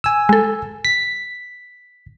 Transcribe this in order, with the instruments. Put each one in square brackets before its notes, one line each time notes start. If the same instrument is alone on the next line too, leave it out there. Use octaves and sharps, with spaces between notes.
[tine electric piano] G#5 E6
[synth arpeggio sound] G#3 A4
[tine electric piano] B6